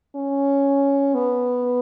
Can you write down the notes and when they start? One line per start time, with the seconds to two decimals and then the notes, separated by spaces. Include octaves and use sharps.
0.16 C#4
1.14 B3